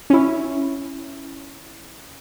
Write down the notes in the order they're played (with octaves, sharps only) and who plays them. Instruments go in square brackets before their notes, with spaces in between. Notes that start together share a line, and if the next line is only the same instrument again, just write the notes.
[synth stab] C#4 E4